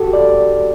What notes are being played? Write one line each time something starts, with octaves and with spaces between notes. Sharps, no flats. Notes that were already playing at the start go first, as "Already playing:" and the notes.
Already playing: F#4 G4 A4
D5